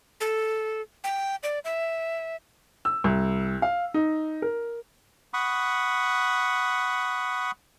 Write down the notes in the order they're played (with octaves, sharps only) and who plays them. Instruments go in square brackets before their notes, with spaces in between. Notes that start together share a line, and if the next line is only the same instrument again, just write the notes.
[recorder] A4
G5
D5
E5
[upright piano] E6
C2
F5
D#4
A#4
[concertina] F#5 B5 C#6 D#6